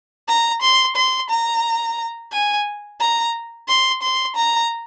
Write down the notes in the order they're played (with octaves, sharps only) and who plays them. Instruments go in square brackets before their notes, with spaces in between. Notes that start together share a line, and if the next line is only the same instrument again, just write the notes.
[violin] A#5
C6
C6
A#5
G#5
A#5
C6
C6
A#5